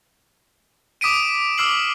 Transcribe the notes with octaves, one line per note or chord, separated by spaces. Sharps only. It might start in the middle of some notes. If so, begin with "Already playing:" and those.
D6 D#6 B6 D7 D#7
D6 E6 F6 C7 F#7